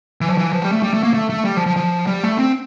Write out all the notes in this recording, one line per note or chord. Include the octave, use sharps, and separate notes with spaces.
E3
F3
E3
F3
G3
A3
G3
A3
A#3
A3
A3
G3
F3
F3
F3
G3
A3
C4